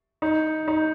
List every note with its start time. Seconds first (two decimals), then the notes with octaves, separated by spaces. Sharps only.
0.22 D#4
0.68 D#4